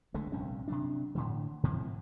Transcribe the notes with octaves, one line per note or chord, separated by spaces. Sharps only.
C#2 D3 G#3 A3
A#1 G2 C3 C#4
C3 F#3 D4
A2 D3 E3
G#2 C3 E3 F3